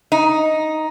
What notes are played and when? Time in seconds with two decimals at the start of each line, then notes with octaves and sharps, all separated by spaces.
0.12 D#4